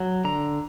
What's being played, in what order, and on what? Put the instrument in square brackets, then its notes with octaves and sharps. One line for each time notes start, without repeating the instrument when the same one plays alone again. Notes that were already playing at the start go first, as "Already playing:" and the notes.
Already playing: [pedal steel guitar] F#3
D3 A#5